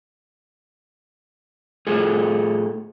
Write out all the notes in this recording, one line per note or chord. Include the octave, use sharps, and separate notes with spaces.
A2 F4 G#4 A4